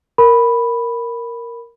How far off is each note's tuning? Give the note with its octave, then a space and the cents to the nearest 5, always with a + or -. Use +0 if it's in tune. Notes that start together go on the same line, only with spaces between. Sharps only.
A#4 +0 B5 +0